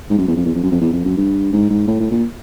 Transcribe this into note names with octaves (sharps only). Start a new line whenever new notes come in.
G#2
F#2
E2
F2
E2
F2
F#2
F2
E2
F2
F#2
G2
G#2
G#2
A2
A2
A#2